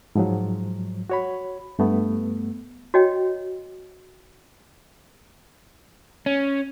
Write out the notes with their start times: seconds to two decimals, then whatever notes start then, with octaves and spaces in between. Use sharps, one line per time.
0.15 G#2 F3 F#3
1.10 F#4 C#5 B5
1.79 G2 A3 B3
2.94 F#4 C#5 D#5 G5
6.26 C#4